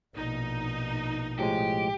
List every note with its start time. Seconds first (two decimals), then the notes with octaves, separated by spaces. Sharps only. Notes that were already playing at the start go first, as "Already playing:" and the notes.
0.16 A#1 B2 D#4
1.39 A2 F3 G#3 G4